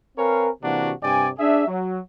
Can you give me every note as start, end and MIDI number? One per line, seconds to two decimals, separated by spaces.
0.17 0.49 60
0.17 0.49 70
0.17 0.49 71
0.17 0.49 73
0.17 0.49 77
0.17 0.49 80
0.63 0.92 48
0.63 0.92 52
0.63 0.92 58
0.63 0.92 62
0.63 0.92 66
1.02 1.29 43
1.02 1.29 48
1.02 1.29 74
1.02 1.29 79
1.02 1.29 80
1.38 1.65 62
1.38 1.65 68
1.38 1.65 76
1.67 1.99 54